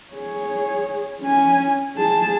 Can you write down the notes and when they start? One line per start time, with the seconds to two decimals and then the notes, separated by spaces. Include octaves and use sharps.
0.14 G#4 C#5
1.21 C#4 G#5
1.97 G#4 A5